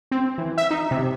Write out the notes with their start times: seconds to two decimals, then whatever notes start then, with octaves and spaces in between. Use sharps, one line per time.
0.11 C4
0.38 E3
0.58 E5
0.71 D#4
0.91 C3